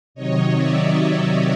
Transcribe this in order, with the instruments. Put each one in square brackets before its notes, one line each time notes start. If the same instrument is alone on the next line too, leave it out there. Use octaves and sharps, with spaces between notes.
[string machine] C3 D#3 F#3 C#5 D#5
D5 E5